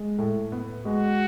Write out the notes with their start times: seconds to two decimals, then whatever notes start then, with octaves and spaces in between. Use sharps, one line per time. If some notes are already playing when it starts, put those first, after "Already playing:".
Already playing: G#3
0.18 A2
0.52 B3
0.85 G#3 F#4